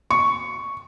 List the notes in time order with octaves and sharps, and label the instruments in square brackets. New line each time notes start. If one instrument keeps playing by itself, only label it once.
[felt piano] C#6